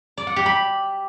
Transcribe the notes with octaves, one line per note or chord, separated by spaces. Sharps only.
D5
F#5
G4
B5